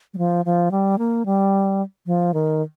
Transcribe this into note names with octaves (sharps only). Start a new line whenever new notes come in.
G3
F3
F3
G3
A#3
G3
F3
D#3